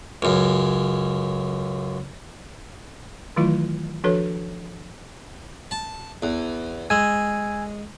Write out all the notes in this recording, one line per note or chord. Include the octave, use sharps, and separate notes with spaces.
C#2 F#2
D#3 E3 F#3 A3 E4 F4
F3 D4 F#4 A4 B4 C#5
A5
E2
G#3 G#5 E6